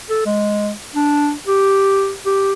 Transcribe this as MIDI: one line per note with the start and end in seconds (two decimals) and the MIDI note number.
0.09 0.23 69
0.26 0.71 56
0.95 1.33 62
1.47 2.13 67
2.26 2.53 67